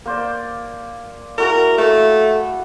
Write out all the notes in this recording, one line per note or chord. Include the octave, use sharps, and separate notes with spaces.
A#3 C5 D5
E4 F#4 G#4 A#4
A3